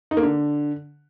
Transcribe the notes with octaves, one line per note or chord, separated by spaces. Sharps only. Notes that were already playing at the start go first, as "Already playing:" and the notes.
D#4
A#3
D3